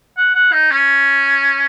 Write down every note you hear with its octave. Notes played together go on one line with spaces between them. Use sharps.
F#5
F#5
D#4
C#4